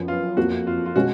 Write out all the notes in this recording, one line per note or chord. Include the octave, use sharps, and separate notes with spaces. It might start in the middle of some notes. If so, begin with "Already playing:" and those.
Already playing: F#2 F3 B3
F4
F2 F3 A#3 F#4
F4
F4
B2 G#3 C#4 F#4